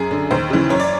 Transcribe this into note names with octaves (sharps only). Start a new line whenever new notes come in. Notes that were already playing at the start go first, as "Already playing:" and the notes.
Already playing: F#2 G#4
D3
D#2 C5
C#3 E3
F#2 C#5
D5